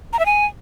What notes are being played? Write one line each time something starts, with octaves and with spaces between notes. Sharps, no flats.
A#5
E5
G#5